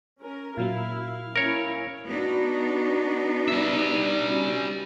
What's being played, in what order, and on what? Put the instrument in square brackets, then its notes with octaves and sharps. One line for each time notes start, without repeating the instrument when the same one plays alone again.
[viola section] C#4 A#4
[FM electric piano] A#2 F#3 A#3 [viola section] E4 [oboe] F5
[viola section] C#4 E4 [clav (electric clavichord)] A#4 C#5
[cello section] B3 D4 D#4 [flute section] F#4
[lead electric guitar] G3 E5
[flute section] C#4 F#4